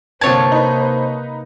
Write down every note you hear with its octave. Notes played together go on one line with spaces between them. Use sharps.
G1 C3 A#3 C4 C5 C#5 A5 G#6
D#4 B4